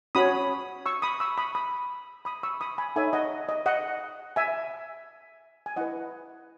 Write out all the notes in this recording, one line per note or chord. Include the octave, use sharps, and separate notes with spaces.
C#4 F#4 C#5 B5 D#6
C#6 E6
B5 D#6
C#6 E6
B5 D#6
B5 D#6
B5 D#6
C#6 E6
B5 D#6
G#5 B5
D#4 A4 C#5 E5 G#5
D#5 F#5
D#5
D#5 F#5
E5 G#5
G#5
E4 B4 D#5 F#5